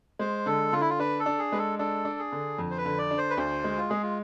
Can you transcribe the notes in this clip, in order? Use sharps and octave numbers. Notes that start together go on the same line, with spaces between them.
G#3 C5
D3 A4
D3 F4
E4
F4
D4 B4
A4
D4
G#4
G#3 B4
A4
D4 A4
D4
G#4
D3
F2
C5
B4
D3
D5
D4
C5
B4
D2 C5
G#3
F4
G#3 G#4
F4